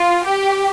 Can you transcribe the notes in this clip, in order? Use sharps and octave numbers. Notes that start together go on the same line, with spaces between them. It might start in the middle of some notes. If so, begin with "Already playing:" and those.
Already playing: F4
G4